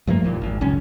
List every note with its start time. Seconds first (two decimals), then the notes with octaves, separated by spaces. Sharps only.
0.07 G2 F3 A3 A#3
0.23 E1 D#2 A#2
0.42 G#1
0.61 C#2 F#2 C#4